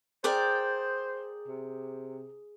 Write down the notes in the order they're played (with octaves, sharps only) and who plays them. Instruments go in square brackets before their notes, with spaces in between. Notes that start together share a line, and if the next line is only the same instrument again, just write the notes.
[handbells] G#4 [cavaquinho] A#4 D5 G5 [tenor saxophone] C5
[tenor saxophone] C3